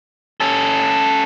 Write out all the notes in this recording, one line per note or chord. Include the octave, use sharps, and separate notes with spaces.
C#4 A4